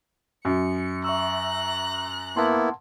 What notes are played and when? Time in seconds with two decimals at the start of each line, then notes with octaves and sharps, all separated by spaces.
0.45 F#2 C#7
1.04 E5 A#5 C#6 E6 F#6
2.37 A#3 B3 E4 F#5 A5 C6